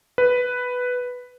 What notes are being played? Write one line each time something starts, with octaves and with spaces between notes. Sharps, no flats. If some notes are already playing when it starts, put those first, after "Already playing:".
B4